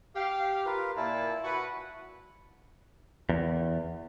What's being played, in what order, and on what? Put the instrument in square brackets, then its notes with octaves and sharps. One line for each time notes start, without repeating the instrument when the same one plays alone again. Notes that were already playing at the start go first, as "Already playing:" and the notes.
[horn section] G4 F5
[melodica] F4 A#4 B4
[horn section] A#2 A5 [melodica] E4
[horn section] F#4 B4
[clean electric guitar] E2